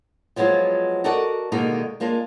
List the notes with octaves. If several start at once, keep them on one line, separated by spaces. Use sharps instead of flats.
F3 F#3 G#3 B3 F4
F#4 A4 A#4 D5 D#5 F#5
B2 D3 D#3 G#3 A#3 D#4
G#3 A#3 D4 F4